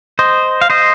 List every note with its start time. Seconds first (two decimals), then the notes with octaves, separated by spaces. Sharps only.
0.19 C5 D#5
0.61 F5
0.70 C5 D#5